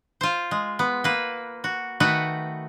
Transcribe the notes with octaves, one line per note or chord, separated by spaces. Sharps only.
F4 C5
G#3
B3
A#3 B4
F#4
D#3 A3 F#4 B4